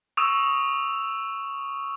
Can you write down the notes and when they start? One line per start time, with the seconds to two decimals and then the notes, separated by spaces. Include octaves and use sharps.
0.17 C#6 D#6 E6 E7 F7